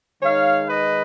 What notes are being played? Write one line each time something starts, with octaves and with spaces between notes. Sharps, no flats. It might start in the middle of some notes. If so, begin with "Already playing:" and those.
D#3 G#3 D#4 C#5 F5
B4 D#5